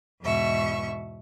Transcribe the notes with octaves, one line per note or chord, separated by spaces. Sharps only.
E2 G#2 B2 E5 C#6